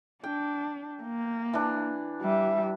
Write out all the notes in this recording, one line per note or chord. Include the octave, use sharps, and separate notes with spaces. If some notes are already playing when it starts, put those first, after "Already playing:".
D4 G5
A#3
E3 D4
G3 E5